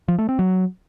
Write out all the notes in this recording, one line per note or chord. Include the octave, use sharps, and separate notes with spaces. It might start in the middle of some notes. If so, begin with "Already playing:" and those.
F3
A3
C4
F#3